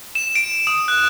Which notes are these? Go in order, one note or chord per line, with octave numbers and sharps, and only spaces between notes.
E7
D7
D#6
F#6